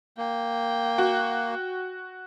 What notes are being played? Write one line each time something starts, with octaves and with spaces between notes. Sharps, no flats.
A#3 G5
F#4